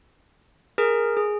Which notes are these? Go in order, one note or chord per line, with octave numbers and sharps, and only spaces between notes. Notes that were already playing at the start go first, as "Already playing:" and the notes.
G#4 A#4
G#4